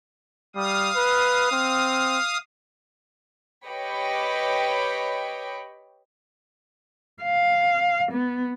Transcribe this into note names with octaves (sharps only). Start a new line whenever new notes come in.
G3 F5 D#6
B4
C4
G4 B4 C#5 D#5 G5 B5
F5
B3